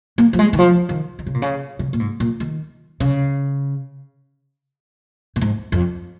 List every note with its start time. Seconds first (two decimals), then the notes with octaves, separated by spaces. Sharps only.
0.18 A#3
0.33 F3
0.39 G#3
0.53 D#3
0.59 F3
0.89 D#3
1.19 D#3
1.26 C#3
1.34 A#2
1.42 C#3
1.79 C#3
1.93 A#2
2.00 G#2
2.20 A#2
2.40 D#3
3.00 C#3
5.36 A#2
5.41 G#2
5.72 F2